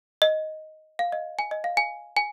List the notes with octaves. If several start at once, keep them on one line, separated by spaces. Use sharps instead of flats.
D#5
F5
D#5
G#5
D#5
F5
G#5
G#5